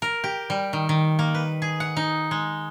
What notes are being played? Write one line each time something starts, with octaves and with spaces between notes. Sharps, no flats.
A#4
G4
G3
D#3
D#3
A#3
B4
G#4
F#5
D#4
G#3